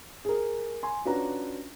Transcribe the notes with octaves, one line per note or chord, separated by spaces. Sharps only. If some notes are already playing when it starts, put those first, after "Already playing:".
G#4 A#4
G#5 C6
C#4 D4 F4 F#4 B4 A#5